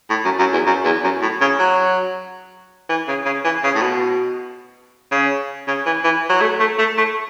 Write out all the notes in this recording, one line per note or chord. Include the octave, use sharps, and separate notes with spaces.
A2
F#2
F#2
E2
F#2
E2
F#2
A2
C#3
F#3
E3
C#3
C#3
E3
C#3
A2
B2
C#3
C#3
E3
E3
F#3
A3
A3
A3
A3